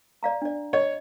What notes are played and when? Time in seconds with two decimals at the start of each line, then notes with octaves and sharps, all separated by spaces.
0.23 D5 F5 A#5
0.42 D4 D5
0.73 C#5 D#5